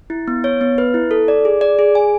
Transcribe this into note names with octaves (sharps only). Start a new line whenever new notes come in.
E4
B3
C#5
B3
B4
E4
A4
D5
G#4
D5
G#4
G#5